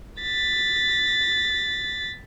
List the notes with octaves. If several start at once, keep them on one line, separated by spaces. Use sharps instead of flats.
A6 B6